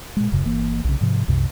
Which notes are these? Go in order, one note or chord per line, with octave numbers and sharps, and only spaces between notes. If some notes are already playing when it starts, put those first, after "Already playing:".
A#2 G#3
D#1 F#2 C#3
G1 E3 A#3
B1 C#3
G#2 C3 F3
C2 F#2 C3